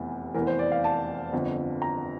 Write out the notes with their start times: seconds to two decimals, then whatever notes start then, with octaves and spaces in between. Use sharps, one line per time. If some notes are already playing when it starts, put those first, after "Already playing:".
Already playing: F1 E2 C3 E3
0.34 F1 E2 E3 A#4
0.47 C5
0.59 D5
0.72 F5
0.84 A5
1.32 G1 F2 D3
1.82 A#5